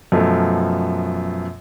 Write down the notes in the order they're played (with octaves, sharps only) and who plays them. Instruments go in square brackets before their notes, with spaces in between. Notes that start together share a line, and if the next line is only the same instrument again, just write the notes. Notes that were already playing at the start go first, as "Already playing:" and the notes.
[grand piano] F#2 B2 F3 A3